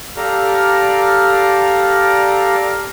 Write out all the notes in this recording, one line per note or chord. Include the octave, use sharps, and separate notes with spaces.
G4 A4 D5 F5 A#5 F6